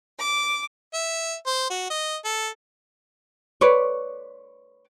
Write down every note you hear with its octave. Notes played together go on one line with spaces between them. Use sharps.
D6
E5
C5
F#4
D#5
A4
B4 C#5 D5